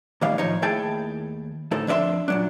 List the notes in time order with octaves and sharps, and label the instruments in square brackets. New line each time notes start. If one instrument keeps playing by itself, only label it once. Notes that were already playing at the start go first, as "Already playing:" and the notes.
[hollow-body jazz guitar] B1 A2 D#3 G3 F5
A2 F3 D#4 C#5
D#2 A3 E4 G#4 G5 A5
D2 A2 D#4 A4 C5
F2 D4 B4 E5 C6
A#2 F#3 D4